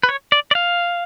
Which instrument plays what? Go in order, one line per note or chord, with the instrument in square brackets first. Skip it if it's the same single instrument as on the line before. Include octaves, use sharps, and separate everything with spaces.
[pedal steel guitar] B4
C#5
D5
D5
F5